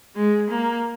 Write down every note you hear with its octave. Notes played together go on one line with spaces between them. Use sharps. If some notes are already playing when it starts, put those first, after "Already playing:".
G#3
A#3